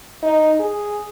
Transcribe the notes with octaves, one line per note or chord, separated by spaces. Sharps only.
D#4
G#4